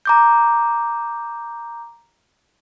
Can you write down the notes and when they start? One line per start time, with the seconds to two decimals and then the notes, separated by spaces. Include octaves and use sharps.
0.05 A#5 D6 G6